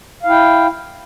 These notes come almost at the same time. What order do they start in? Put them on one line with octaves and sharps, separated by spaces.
F5 E4 G5